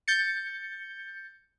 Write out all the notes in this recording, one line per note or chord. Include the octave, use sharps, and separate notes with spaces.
G6 A6 C#7